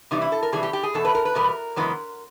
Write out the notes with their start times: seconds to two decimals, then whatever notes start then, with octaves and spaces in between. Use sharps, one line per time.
0.11 C3 E3 G3 D#4
0.22 E4
0.32 A4
0.43 A#4
0.52 C3 E3 G3 G#4
0.63 G4
0.73 G4
0.83 G#4
0.94 E2 B2 A4
1.05 B4
1.15 A#4
1.25 B4
1.35 E2 B2 G3 B3 A#4
1.76 F#2 C#3 E3 G#3 B3